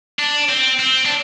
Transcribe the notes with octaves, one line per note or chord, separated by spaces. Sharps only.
D4
C4
C4
D4